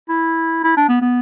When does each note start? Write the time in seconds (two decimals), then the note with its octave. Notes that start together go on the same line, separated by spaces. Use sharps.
0.09 E4
0.64 E4
0.77 D4
0.89 B3
1.01 B3